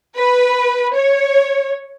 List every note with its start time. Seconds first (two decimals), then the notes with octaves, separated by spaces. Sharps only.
0.16 B4
0.96 C#5